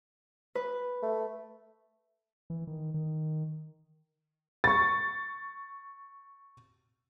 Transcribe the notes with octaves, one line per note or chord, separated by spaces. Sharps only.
B4
A3
E3
D#3
D#3
C#6 A6